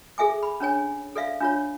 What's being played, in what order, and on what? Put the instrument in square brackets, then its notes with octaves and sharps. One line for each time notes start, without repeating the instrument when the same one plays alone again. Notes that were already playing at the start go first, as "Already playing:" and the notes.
[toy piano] G#4 A4 E5 G#5 D6
B5
C#4 D4 C#5 G#5
A4 D5 E5 F5
D4 F4 C#5